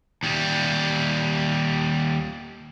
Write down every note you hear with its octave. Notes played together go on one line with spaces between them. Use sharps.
D#2 G3